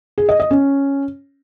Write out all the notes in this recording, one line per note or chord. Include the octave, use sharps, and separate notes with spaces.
G#4
D#5
D#5
C#4